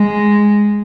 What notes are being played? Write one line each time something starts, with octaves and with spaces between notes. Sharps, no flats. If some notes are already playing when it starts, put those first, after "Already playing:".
Already playing: G#3